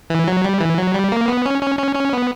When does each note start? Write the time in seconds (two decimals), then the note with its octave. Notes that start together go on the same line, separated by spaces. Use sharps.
0.10 E3
0.27 F#3
0.44 G3
0.60 E3
0.78 F#3
0.94 G3
1.12 A#3
1.28 B3
1.46 C#4
1.62 C#4
1.79 C#4
1.95 C#4
2.13 B3